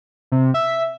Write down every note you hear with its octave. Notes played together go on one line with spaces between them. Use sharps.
C3
E5